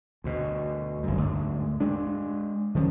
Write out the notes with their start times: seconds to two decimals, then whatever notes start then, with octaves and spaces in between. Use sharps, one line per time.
0.24 D2 B2
1.03 G1 F#2
1.17 D2 G#2
1.80 G#3 D4
2.75 D#3 F3 A#3 C#4